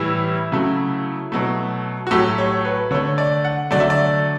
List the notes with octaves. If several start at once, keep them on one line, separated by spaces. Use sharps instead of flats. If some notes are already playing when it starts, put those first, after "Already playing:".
Already playing: A2 E3 G3 E4
C#3 F#3 A3
B2 F#3 A3
F#4
A2 F#3 A3 G4
C#5
B4
D3 A3 C#5
D5
F#5
D3 F#3 A3 D5
E5
D5